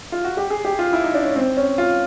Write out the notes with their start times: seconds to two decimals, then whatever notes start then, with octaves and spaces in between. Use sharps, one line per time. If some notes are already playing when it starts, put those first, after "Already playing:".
0.12 F4
0.25 F#4
0.37 G4
0.50 G#4
0.65 G4
0.79 F4
0.93 E4
1.04 D#4
1.14 D4
1.25 C#4
1.36 C4
1.57 C#4
1.78 F4